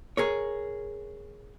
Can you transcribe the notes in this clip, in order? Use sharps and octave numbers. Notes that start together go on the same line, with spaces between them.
G#4 A#4 C#5